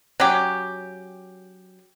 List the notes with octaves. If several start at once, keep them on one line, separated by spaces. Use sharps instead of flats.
F#3 C#4 G4